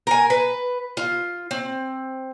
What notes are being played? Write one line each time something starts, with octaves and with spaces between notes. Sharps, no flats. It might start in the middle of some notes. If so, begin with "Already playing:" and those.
A#4 G#5
B4
F4
C4